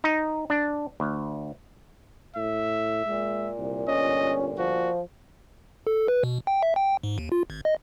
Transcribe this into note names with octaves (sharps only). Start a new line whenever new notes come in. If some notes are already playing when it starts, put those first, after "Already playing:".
D#4
D4
D2
A2 E5
A#2 G#3
C2
G1 C#4 D#5
F3 F#4
A4
B4
B2
G5
E5
G5
G#2
D#2
F4
G#1
D#5